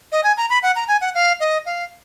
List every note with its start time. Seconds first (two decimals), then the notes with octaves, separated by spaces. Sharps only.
0.12 D#5
0.24 G#5
0.37 A#5
0.50 B5
0.63 F#5
0.76 A#5
0.88 G#5
1.01 F#5
1.15 F5
1.40 D#5
1.66 F5